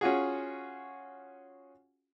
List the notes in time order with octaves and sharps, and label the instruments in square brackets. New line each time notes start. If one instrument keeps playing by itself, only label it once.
[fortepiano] C#4 F4 F#4 G#4